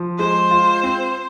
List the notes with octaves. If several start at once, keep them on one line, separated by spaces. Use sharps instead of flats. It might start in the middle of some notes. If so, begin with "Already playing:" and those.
Already playing: F3
G#3 C5
F4
C4